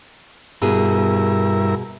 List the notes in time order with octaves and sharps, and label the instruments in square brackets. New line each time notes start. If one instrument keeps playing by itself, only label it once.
[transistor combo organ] G2 E4 A#4 [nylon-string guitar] B2 G#4